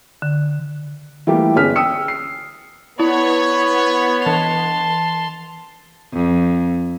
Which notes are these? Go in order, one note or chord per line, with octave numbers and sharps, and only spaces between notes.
D3
E3 G3 A3 A#3 F4 G4
G1 C#4 G#4 F6 B6
G5 D#6 E6 C#7
C7
B3 E4 C#5 B5
E3 A5 C6 F7
F2